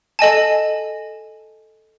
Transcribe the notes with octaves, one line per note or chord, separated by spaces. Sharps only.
A4 D#5 G#5 A5